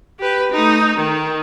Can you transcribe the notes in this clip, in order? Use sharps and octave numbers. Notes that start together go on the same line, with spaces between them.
G4 B4
A3 D#4
D#3